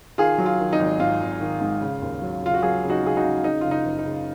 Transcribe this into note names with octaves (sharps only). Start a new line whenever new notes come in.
D#3 F4 G#4
F#3
F4
D#3
D#4
G#1
G#2 F4
G#1
D#3
G#2
C#3
D#2
F#3
C#3 F4
F#4
F#3 F4 G#4
C#3
D#4 F#4
C#3 G#4
D#4 F#4
C#3
C#3 D#4
F#1 F4
D#4
F#1
D#4
C#3